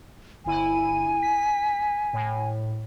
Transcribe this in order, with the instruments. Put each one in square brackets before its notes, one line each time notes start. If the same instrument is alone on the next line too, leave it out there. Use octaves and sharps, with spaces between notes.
[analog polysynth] G1 E4 D#7 [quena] G#5
[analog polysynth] B6
A2